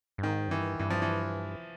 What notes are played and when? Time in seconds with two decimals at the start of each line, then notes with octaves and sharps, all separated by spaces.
0.18 G2
0.23 G#2 D#3
0.48 F#2
0.51 G2 E3
0.79 G2 E3
0.90 F3
1.02 E3